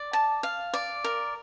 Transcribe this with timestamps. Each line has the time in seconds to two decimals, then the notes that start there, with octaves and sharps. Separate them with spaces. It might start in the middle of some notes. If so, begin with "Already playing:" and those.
Already playing: D5
0.13 A5
0.43 F5
0.74 D5
1.04 A#4